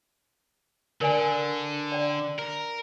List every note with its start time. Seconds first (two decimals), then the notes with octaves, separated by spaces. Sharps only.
1.01 D3 A#4 D5 G#5
1.92 D5 G5
2.39 A#4